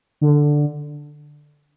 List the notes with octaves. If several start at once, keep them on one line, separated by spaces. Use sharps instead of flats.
D3